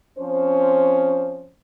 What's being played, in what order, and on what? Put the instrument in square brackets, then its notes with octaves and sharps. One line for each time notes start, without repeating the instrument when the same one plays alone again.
[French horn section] F3 C4 C#4 C5